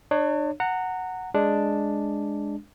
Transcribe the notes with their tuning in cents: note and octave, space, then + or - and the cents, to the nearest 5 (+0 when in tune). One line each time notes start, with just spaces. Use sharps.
D4 +35 C#5 +0
F#5 +0 A#5 -25
G#3 +0 D4 +0